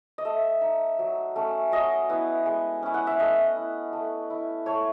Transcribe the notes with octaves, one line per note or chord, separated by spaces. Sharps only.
D#5
A3 E5
D#4
F#3
A3 C#4
F#3 D#5
B3 E4
G#3
C#4 E4
F#5
E5
A3 D#5
E4
A3
E4
A3 C#5